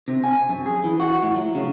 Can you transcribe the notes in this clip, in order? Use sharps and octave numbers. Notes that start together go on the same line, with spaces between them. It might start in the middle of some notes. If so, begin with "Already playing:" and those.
C3
G#5
F#2
G#4
E3
F#4
A2
F#3
C#3